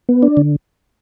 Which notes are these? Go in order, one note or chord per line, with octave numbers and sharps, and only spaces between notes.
B3
D4
D3